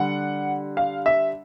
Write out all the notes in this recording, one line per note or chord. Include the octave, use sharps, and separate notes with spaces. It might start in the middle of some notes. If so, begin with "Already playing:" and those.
Already playing: D3 G3 F#5
F5
E5